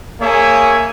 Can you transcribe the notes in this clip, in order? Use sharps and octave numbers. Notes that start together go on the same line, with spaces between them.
A#3 G#4 C#5 E5 G#5